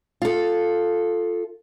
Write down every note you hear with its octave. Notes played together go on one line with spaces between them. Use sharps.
F4 A4